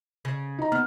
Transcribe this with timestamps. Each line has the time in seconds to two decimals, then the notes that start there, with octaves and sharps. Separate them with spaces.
0.25 C#3
0.59 D#4 A#5
0.72 B3 F6